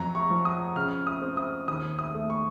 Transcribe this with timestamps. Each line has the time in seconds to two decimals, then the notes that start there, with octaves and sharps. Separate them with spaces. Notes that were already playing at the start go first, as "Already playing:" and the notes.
Already playing: F2 F#3 A#5
0.15 C#6
0.30 F3
0.45 D#6
0.76 C#3 F6
1.07 D#6
1.22 C4
1.37 D#6
1.68 D#2 D#6
1.99 D#6
2.14 A3
2.30 C#6